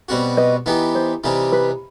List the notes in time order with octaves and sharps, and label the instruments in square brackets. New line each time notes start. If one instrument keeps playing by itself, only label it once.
[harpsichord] B2 G3 C4 F#4
[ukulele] B4 D#5
[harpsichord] E3 B3 D#4 G4
[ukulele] C5
[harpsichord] C3 E3 G3 D#4
[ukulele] B4